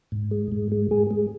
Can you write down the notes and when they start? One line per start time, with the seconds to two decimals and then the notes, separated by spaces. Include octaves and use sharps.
0.12 G#2
0.31 G#3
0.52 G#2
0.72 G#3
0.91 G#3 G#4
1.11 G#3